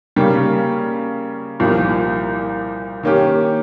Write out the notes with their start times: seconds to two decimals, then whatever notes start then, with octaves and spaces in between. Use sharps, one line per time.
0.16 C#3 G3 A#3
1.60 C2 A#2 F3
3.03 D#3 A#3 C#4 G4